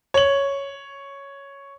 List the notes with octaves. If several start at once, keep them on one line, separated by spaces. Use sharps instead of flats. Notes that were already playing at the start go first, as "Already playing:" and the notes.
C#5 F#7